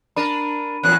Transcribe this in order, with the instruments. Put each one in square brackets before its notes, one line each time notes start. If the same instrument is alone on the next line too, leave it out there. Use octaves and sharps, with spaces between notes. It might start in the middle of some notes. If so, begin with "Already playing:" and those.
[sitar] D4 A#4 [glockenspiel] B5 D#7
[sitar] E2 A#2 F#3 [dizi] F#6